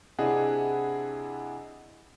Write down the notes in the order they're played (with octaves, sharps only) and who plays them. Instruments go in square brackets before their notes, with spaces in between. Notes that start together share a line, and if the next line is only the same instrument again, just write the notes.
[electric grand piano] C3 D4 E4 G#4 D#5 F#5